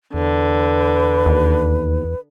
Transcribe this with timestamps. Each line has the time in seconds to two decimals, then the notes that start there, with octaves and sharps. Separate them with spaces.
0.14 E2 D3 B4
1.26 D#2